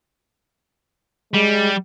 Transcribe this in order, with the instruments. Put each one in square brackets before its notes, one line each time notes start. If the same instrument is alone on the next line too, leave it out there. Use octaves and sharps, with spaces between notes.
[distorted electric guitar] G3 [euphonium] G#3